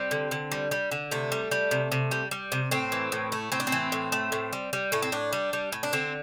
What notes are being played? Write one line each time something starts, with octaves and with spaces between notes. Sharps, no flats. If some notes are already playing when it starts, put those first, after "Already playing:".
Already playing: G3 C4
D3
D3
G3
G3
D3
C3 A3
G3
G3
C3
C3
G3
G3
C3
A2 C4
E3
A2
A3
A2 C4
D4
C4
E3
A2
A3
A2
G3
G3
A2 A3
C4
A2 D4
G3
G3
A2
D4
D3 C4